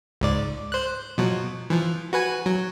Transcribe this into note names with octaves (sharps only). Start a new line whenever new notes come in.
C#2 G#2 D5
C5 F#6
B2 F3 F#3
E3 F3
F#4 B4 G#5
F#3